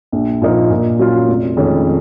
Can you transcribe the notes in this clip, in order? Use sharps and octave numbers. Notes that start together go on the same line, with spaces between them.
A#1
A#2 F3 A#3 D#4
A#2
F#3 C#4 F4
F1
F2 D#3 G#3 C#4